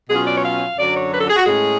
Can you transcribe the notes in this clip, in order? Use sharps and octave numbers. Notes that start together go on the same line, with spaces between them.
B2 F#3 C#4 F4 G#4
D5
C#5
F5
F#2 D3 F#3 D5
C#5
B4
A4
G#4
F#4
A2 G#3 C#4 G#4